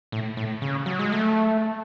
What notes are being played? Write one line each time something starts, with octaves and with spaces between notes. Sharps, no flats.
A2
A2
C#3
F#3
G#3
A3